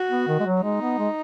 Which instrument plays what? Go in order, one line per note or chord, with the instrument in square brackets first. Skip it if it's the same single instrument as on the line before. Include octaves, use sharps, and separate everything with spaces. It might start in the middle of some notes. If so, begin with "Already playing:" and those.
Already playing: [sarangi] F#4
[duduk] B3
D#3
G#3
F#3
[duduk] G#3 [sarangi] D#4
[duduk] B3
G#3